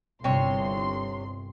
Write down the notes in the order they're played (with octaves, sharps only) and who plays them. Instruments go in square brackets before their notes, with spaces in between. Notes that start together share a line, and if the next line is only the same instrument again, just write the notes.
[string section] G1 C2 C6 [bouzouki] C3 C#5